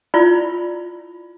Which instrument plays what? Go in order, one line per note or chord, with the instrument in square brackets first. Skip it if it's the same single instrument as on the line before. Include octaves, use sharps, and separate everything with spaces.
[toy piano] E4 F4 D5 B5